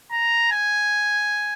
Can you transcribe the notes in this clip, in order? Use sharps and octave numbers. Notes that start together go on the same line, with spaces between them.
A#5
G#5